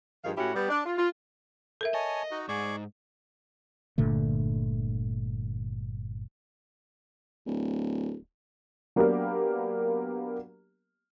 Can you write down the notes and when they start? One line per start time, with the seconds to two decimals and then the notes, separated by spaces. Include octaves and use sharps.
0.24 G2 D#3 F3 G#4 F5
0.37 A2 C#4 E4 F#4 G4
0.55 G3 B3
0.69 D4 D5
0.86 F4
0.97 F4
1.81 A4 A#4 E5
1.94 C#5 D#5 G#5 A5
2.31 D#4 F#4
2.49 G#2 G#4 D5 C#6
3.98 G1 A#2 D3 A3
7.46 D1
8.96 F#3 A#3 B3 D4 G4 A#4